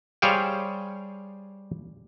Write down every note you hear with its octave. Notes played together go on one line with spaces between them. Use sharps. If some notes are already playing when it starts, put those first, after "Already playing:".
G3 G#4 C5 C#5 F5 G5